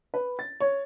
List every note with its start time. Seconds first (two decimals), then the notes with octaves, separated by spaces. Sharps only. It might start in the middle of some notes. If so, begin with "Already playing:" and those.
0.14 B4
0.39 A6
0.60 C#5